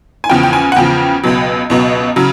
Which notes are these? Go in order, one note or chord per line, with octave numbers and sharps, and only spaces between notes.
G#5
E2 C#3 F3 G5
G5
G#5
F#5
E2 C#3 F3 G5
C#2 B2 F#3
C#2 B2 F#3
C#3 F#3